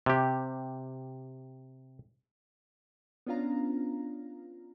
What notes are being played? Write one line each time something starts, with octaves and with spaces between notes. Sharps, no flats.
C3 G4
B3 C#4 D4 F4 F5 A#5